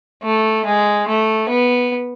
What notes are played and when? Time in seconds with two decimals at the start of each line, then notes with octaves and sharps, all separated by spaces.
0.23 A3
0.65 G#3
1.08 A3
1.49 B3